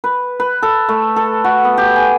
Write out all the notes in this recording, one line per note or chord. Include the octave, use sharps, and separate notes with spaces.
B4
B4
A4
A3
A4
F#4
B3
G4
G#5